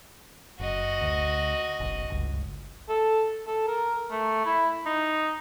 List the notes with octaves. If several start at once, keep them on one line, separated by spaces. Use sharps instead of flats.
F#1 F#4 D#5
D2
F#1 B1
G1 C#2
A4
A4
A#4
A3
E4
D#4